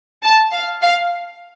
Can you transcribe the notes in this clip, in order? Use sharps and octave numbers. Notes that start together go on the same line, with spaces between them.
A5
F5
F5